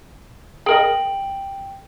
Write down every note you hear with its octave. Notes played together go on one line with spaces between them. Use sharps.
G#4 A#4 D#5 G5 D7 F#7